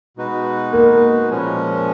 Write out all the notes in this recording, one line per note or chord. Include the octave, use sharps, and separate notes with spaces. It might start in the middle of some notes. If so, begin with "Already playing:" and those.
B2 G#3 D#4 F#4 B4
A#3
A#2 F3 G#3 C#4